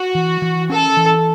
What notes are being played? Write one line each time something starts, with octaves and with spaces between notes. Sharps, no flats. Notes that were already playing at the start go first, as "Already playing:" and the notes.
Already playing: F#4
E3
E3
C#4 A4
E3